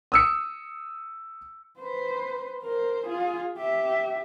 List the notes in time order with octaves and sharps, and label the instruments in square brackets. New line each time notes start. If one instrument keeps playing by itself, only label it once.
[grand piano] D#6 E6 C#7
[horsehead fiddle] B4 C5
A#4 C5
F4 G#4
G4 E5